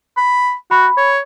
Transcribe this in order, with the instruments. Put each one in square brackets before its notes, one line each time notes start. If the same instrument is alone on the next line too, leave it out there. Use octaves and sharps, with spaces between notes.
[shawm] B5
[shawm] F#4 [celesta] B5
[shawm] C#5